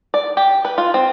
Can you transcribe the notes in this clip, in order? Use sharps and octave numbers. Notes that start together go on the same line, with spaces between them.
D5
G4
B4
F4
C4